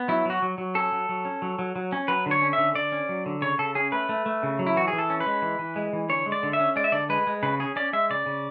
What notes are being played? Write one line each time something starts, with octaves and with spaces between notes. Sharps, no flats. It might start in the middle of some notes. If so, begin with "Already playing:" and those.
Already playing: B3
F#3 E4
F#3 F#4
F#3
F#3
C#4 A4
F#3
F#3
C#4
F#3
F#3
F#3
C#4
F#3 B4
D3
C#5
C#4
E5
D3
D3 D5
C#4
F#3
D3
C#3 C#5
C#3 A4
C#4 G#4
A3 B4
A3
A3
C#3
F#3
E4
E3 F#4
G#4
E3
A4
C#4
B4
G#3
E3
E3
G#3
E3
D3 C#5
G#3
D5
D3
E5
C#4
G#3 D5
E5
D3 D5
G#3 B4
G#3
C#3 B4
C#4 G#4
C#4 D5
G#3 E5
C#3 D5
C#3